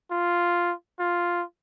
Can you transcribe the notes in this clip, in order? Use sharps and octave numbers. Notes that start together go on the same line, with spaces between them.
F4
F4